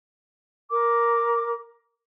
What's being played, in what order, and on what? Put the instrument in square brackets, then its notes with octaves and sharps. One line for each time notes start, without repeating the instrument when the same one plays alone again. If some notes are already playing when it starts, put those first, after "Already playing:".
[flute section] A#4 D6